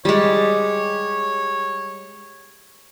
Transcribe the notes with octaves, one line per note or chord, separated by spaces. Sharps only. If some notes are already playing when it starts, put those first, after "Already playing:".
G3 G#3 C#5